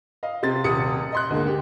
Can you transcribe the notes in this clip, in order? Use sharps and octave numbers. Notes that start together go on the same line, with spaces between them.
D#5 F5
C3 C4 A6
D#1 C3 D#6 C#7
D#5 C6 F#6
D2 G#2 A#3
G4